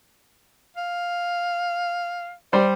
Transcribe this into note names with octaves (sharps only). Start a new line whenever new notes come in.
F5
G3 C5 D5